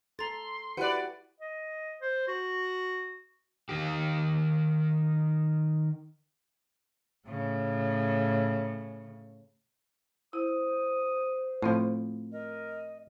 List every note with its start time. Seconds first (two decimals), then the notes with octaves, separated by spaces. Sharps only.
0.19 A4 A#5 C6 A6
0.77 E4 F#4 G4 B4 D5 F#5 F#6
1.41 D#5
2.01 C5
2.28 F#4
3.69 D#3 G4
7.27 A2 C#3
10.33 E4 C5 D#6
11.62 A2 F3 A3 C4
12.32 A#4 D#5